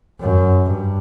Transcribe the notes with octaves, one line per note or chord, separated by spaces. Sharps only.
F#2
G2